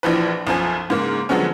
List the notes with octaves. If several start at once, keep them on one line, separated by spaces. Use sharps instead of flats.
A#1 E3 F3 B4
B1 F#2 F3 G#5
G#2 C#3 A#3
D3 F3 F#3 G#3 B3 C#4